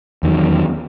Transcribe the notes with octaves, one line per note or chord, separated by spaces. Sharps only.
E2 D#3 F#3